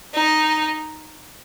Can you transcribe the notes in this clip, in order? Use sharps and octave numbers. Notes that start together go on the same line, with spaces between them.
D#4